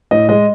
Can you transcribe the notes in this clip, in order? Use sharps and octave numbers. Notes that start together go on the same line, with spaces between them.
A2 D#5
G#3 D#5